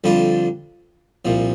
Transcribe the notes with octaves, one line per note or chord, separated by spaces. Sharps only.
F2 D3 G3 D4 F4
C2 A#2 F3